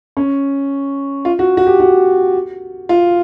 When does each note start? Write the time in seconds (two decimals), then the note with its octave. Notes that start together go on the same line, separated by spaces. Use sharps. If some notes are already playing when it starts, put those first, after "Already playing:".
0.17 C#4
1.25 F4
1.39 F#4
1.57 F#4
1.67 G4
1.80 F#4
2.89 F4